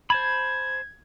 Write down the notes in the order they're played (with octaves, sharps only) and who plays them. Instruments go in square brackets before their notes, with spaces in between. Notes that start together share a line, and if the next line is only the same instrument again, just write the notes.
[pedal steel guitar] C5 A5 B5 [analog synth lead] G#6